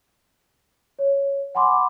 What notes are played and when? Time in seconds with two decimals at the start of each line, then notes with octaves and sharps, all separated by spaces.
0.99 C#5
1.55 F#5 G#5 B5 C6 D6